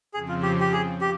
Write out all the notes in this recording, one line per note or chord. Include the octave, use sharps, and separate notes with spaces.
F2 C#3 F3 C4 G#4
F4
G4
G4
G#4
G4